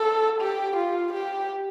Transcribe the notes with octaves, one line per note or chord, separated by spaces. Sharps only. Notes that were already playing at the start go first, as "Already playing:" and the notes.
Already playing: A4
G4
F4
G4